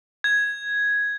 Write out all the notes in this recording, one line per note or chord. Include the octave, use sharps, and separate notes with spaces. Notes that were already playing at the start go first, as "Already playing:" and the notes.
G#6